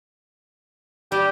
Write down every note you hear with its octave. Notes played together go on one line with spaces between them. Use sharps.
G3 G4